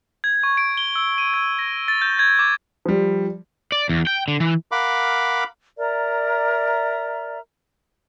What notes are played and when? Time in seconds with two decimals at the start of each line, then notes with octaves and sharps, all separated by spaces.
0.24 G#6
0.43 C#6
0.57 D7
0.77 G7
0.96 E6
1.18 D#7
1.34 G#6
1.59 A#6
1.88 A6
2.02 G6
2.19 G#6
2.39 D6
2.85 F3 G3
3.72 D5
3.89 E2
4.07 G5
4.28 D3
4.40 E3
4.72 A#4 F5 F#5 B5 D6
5.79 A#4 D5 E5 A#5